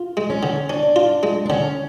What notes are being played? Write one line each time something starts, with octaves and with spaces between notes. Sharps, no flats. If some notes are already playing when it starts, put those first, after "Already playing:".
Already playing: F4
G#3
C#4
D3
C#4 D4
F4
G#3
D4
D3 C#4